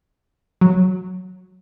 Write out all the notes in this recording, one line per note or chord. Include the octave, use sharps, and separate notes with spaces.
F#3